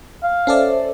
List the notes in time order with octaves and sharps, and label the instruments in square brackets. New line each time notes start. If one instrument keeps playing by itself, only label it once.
[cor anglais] F5
[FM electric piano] C#4 A4 D5 [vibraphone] C5 E5